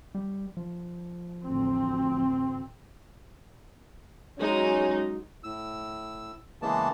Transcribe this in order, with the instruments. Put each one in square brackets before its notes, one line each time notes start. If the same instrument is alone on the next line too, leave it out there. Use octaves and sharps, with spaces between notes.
[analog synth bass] G3
F3
[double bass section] A1 D2 C4
[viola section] F#3 G#3 D#4 [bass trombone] C#4
[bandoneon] A2 E6
C#3 E3 G#3 A#3 B3 A5